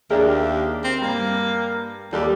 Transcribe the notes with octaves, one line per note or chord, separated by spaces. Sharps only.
D#2 D4 G4 G#4 A#4 E5
C4
G2 A#3
D#2 G3 F#4 G4 A4